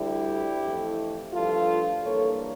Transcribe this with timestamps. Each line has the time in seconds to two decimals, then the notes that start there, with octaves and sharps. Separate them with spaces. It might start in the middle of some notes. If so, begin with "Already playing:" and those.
Already playing: D2 D3 G3 E4 G4
0.63 F2 E3 A3
1.33 G2 F3 A3 F4 A4
2.03 G2 E3 A#3 A4 C#5